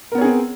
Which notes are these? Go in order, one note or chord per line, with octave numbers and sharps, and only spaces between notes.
B3 C4 G#4 A#4 C#5